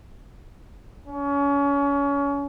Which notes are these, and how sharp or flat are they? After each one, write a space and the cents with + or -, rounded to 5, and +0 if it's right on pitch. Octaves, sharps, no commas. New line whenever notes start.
C#4 +30